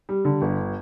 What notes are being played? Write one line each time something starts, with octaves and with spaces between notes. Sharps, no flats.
G3
D3
G1